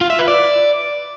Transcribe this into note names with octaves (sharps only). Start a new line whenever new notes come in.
F4
E5
B4
D5